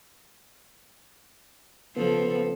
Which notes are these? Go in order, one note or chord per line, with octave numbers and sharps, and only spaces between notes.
C#3 F3 B3 A4